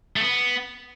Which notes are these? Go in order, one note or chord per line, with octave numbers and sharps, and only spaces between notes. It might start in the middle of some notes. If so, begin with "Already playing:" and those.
A3
B3